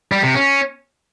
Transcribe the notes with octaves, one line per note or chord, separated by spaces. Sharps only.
G3
C3
C#4